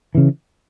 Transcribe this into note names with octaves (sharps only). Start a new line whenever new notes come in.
C#3 E3